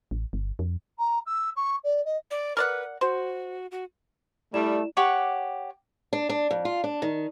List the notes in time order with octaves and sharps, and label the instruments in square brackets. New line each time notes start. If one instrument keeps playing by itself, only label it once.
[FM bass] A1
G1
F2
[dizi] A#5
E6
C#6
D5
D#5
[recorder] D5
[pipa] A#4 D5 F#5 [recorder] B4
[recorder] F#4 [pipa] C5
[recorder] F#4
[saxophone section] G3 [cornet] A3 [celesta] E4 D5 E7
[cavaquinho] G4 C#5 F#5 D6
[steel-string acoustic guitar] D4
D4
F2
F4
D4
D#3